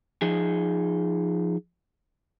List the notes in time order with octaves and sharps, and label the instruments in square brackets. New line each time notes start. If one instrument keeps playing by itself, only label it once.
[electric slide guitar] F3 D#4 G#4